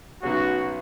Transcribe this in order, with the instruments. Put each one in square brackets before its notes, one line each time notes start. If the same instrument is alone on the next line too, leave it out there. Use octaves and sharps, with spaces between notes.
[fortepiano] B1 B2 F#3 C#4 G#4 [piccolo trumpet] F#4